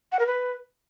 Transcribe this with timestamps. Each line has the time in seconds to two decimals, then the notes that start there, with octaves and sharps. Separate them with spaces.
0.12 F#5
0.19 A#4
0.27 B4